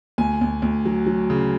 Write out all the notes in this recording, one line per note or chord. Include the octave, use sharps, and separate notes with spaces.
D2 G#5
D2
D2
F#3
F#3
C#3